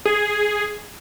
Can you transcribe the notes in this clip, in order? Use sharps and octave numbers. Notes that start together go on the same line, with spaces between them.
G#4